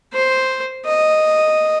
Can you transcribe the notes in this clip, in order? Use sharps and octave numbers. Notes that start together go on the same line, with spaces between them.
C5
D#5